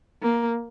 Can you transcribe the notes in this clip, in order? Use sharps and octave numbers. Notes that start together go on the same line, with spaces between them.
A#3